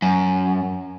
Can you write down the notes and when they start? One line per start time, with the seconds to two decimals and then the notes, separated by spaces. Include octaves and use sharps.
0.02 F#2